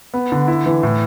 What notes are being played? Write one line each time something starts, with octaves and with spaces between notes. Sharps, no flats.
B3
D3
E4
E3
A2